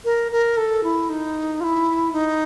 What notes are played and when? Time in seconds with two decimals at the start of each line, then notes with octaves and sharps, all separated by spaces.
0.05 A#4
0.32 A#4
0.57 A4
0.84 E4
1.09 D#4
1.60 F4
1.64 E4
2.13 D#4